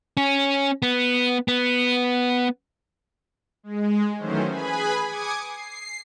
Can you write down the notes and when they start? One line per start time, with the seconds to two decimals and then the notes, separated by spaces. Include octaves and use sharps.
0.17 C#4
0.82 B3
1.48 B3
3.63 G#3
4.18 D#3 E3 F#3 A3 C#4 C5
4.48 G#4 B4 G#5 B5
5.07 G#5 D6 D#6 G#6 C#7
5.46 C7